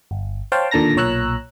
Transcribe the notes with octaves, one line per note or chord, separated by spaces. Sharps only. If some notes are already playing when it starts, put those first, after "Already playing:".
G1
C5 C#5 F5 G5 A5
D#2 A#2 D3 A5 A#5 A#6
B1 A#2 C#5 A#5 E6 F#6